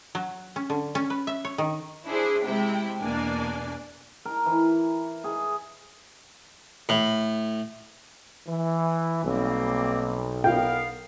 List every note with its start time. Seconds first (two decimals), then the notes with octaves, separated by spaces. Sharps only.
0.15 F#3
0.56 C#4
0.70 D3
0.95 C#4
1.10 B4
1.27 E5
1.45 C#5
1.58 D#3
2.08 D4 E4 G#4 C5
2.45 C3 G#3 E4 G5
3.02 E2 B2 A#3 D4 D5 G#5
4.25 A#4
4.46 E3
5.24 G#4
6.89 A2
8.47 E3
9.24 B1 G3 A#3 C4
10.44 B3 A#4 F5 G5